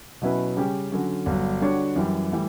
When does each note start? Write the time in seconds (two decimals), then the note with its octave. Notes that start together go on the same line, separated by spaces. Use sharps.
0.22 B2 F#3 C#4 E4 B4
0.57 C#3 G3 C#4 G4
0.92 D3 F#3 C#4
1.26 G1 G2 F#3
1.61 D3 G3 D4 F#4 C#5
1.96 F#2 E3 G3
2.32 A2 E3 G3